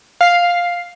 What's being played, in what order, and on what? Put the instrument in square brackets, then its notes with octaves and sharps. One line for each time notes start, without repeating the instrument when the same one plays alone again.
[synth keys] F5 C7